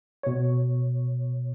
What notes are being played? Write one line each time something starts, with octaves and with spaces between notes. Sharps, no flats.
B2 C#5